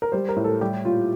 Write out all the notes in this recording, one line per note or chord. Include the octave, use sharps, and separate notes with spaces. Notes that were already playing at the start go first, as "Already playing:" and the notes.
A#4
G3 C5
A#4
A2
A4
G3 G4
A#2 F4